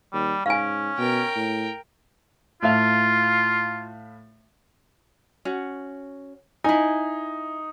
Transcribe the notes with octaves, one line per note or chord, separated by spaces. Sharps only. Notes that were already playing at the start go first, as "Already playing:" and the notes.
D#2 G3
G#2 C#4 F5 G#5
B2 A#4 G5
A2
A2 F4 E5 F5
C#4 F#4
D#4 E4 G#5